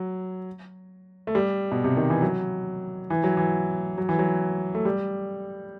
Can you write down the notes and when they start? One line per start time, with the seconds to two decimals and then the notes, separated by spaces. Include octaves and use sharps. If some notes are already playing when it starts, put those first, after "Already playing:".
Already playing: F#3
1.27 A3
1.35 G3
1.72 B2
1.84 C3
1.97 D#3
2.10 E3
2.22 F#3
3.10 E3
3.24 F#3
3.37 E3
3.98 F#3
4.09 E3
4.19 F#3
4.75 A3
4.85 G3